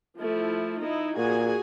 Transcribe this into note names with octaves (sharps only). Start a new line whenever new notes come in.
F3 A3 E4
D#4 E4
A#2 F#4 G#4 G#5